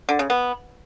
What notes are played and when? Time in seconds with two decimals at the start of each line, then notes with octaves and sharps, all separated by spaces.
0.09 D3
0.19 C#3
0.30 B3